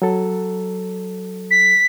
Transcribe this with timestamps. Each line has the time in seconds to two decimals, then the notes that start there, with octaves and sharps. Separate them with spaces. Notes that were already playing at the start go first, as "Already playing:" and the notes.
0.02 F#3 A4
1.51 B6